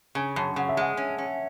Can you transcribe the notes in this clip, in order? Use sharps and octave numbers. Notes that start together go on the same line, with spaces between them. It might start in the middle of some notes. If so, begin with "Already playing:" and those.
C#3 G#5
F#2 A5
C#3 F#5
E5
G#3 F#5
C#4
C#4